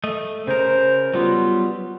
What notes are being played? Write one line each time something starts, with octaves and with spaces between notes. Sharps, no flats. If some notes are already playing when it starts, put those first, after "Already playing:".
A3 D#5
C#3 A#4 C5
F#3 G3 B3 F4